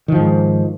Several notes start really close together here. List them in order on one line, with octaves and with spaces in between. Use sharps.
D#3 F3 G#2